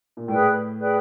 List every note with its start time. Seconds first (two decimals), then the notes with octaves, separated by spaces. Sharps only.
0.17 A#2
0.28 A2 G#4 B4 D5 G5
0.78 G#4 B4 D5 G5